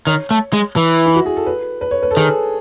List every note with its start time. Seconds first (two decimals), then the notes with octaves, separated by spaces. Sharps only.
0.07 D#3 C#5
0.31 A3
0.53 G#3
0.76 E3
1.06 E4
1.15 F#4
1.26 G#4
1.36 A4
1.46 B4
1.81 B4
1.91 C#5
2.03 B4
2.11 A4
2.17 D#3 G#4